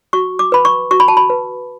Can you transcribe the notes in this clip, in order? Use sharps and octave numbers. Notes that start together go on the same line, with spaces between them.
F#4 C#6
D6
B4 B5
C#6
F#4 C#6
B5
A5
B5
B4